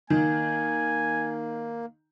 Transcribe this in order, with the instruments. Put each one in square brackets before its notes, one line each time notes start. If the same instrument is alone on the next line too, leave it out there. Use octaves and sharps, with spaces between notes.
[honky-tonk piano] D#3 [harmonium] A#3 [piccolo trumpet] G#5